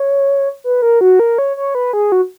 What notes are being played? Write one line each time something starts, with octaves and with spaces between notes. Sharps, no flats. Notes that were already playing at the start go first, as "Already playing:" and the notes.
Already playing: C#5
B4
A#4
F#4
A#4
C#5
C#5
B4
G#4
F#4